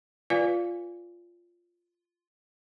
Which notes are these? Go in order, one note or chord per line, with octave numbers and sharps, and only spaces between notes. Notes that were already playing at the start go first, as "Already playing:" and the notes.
F4 B4 D5 F5 G#5